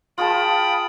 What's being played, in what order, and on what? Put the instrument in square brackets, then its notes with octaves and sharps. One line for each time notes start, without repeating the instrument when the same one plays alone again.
[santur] F4 G#4 A5 [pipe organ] G5 B5 D#6